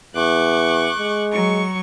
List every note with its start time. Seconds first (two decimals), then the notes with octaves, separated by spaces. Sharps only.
0.15 E2 C#6 D6 F#6
0.98 G#3
1.32 F#3 C#6